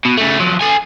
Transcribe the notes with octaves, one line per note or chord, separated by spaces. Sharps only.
B2
C#3 A3
F3 F#3
A4 G#5